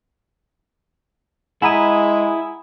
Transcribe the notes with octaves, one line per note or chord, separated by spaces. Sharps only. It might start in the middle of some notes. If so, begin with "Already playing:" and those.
G#3 E4 F#5 G#5 A#5 B5 D#6 D#7